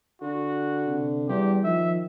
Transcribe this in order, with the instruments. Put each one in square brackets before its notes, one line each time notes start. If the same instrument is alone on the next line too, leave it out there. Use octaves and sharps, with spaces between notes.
[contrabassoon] D3 [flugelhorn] F#4
[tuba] C3
[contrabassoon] E2 [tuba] G3 [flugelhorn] G4
[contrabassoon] D#3 [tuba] F3 [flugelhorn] E5